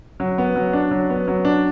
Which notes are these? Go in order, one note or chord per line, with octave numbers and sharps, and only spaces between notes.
F#3
B3
F#3
D4
F#3
B3
F#3
D4